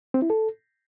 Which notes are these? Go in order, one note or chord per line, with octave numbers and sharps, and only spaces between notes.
C4
E4
A4